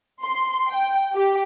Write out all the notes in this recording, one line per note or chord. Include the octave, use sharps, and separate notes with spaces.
C6
G5
G4